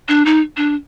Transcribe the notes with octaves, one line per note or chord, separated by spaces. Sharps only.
D4
D#4
D4